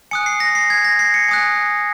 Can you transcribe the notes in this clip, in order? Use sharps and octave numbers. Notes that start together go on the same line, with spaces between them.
G#5 D#6 F#6 C#7
C7
A#6
C7
G#6
A#6
C7
C#7
G#5 D#6 F#6